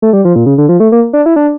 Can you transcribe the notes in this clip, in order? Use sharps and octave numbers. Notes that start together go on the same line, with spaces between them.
A3
G3
F3
A#2
C#3
D3
F3
A3
A#3
D4
E4
D4